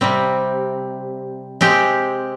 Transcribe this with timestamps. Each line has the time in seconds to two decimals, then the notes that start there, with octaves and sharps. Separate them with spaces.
0.01 C3 G3 C4
1.61 G#3 C4 G4